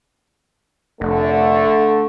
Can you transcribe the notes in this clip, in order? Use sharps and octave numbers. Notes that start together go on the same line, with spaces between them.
F1 D3 A3